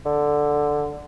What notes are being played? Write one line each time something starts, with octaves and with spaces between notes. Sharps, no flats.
D3